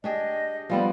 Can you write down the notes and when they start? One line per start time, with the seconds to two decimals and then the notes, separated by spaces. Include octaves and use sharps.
0.04 D4 G4 G#4 D#5
0.70 F3 G3 B3 D5